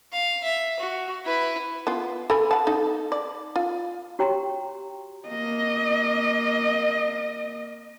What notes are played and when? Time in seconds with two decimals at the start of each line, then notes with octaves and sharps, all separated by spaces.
0.13 F5
0.44 E5
0.80 F#4
1.25 E4 B4
1.87 B3 F4
2.30 A4 G#5 B5
2.51 F#5 A5
2.67 D#4 A4
3.12 D5
3.56 F4
4.19 F#4 G4 C#5 G5 A#5 C6
5.29 A#3 D#5